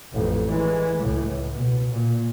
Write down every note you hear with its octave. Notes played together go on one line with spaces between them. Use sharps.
A1 F2
E3 G#3
C#2 A2
B2
A#2